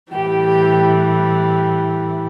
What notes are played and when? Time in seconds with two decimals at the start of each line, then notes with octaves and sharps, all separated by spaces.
0.13 A2 E3 G3 G4
0.46 G4